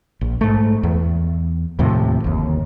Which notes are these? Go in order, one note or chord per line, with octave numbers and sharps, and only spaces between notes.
A#1
G#2 A3
E2
D#2 A2 C3 F3
G1 D#2